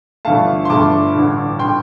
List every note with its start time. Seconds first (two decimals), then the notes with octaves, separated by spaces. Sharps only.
0.25 G1 G2 D3 A3 F5 A5
0.65 C6
0.70 G1 G2 D3 A3 A5 D6
1.15 A1 G2 D3
1.59 D3 G5 C6